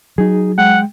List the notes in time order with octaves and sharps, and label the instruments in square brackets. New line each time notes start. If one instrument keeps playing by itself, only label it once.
[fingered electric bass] F#3 [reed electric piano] D#4 G#4
[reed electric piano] G#3 G5 [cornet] F#5